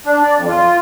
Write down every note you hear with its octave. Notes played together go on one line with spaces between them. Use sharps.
D4
D5
F2
F4